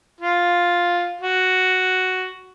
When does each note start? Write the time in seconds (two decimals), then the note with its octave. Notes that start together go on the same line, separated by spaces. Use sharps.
0.21 F4 F5
1.21 F#4